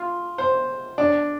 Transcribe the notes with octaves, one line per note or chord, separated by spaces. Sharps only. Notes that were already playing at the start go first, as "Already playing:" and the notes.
Already playing: F4
C5
D4